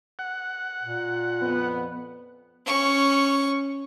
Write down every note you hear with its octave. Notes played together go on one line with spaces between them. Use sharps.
F#5
A#2
F2 B3
C#4 C#6